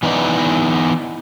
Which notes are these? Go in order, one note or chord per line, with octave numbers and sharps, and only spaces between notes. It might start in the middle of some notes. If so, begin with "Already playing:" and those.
E3 B3 D#4 E4 D5